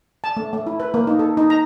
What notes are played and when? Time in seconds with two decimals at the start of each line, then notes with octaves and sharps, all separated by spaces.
0.24 A5
0.37 A3
0.53 A3
0.67 E4
0.80 B4
0.94 A#3
1.07 D#4
1.19 A4
1.37 D#4
1.50 A#5